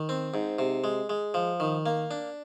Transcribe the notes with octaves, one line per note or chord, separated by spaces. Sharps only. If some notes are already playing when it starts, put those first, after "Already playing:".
Already playing: D#3
C4
G#2
C3
G#3
G#3
F3
D#3
A#3
D4